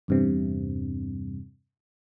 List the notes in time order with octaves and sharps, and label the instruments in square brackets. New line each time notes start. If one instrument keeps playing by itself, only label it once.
[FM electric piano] E2 G2 C3